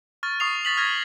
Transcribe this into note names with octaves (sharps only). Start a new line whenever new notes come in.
C#6 F6 A6
C#6 D#6 C7 F7
A6 B6 F#7
F6 G#6 A#6 B6